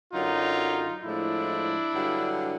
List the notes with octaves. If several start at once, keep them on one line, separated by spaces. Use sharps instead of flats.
F#2 D3 F#3 D#4 F4
A2 F3 G#3 D4 E4
G2 D3 F#3